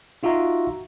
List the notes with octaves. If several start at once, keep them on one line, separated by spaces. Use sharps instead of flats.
D#4 F4 F#4 E5 A#5